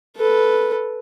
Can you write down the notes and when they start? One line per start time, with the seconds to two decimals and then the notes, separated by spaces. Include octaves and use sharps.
0.17 A4 B4